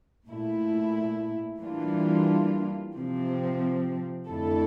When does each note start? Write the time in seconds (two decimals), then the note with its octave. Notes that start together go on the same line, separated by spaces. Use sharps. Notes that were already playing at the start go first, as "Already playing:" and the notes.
0.26 A#2 A3 E4
1.59 E3 G3 A#3 D4 F4
2.94 C3 F3 C4
4.27 F2 D3 A3 E4 A4